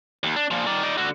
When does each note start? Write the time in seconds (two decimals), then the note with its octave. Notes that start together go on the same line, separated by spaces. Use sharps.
0.23 D#2
0.36 D4
0.51 A#2 F3
0.66 D#3 D5
0.83 D#4 D5
0.98 D3 F#4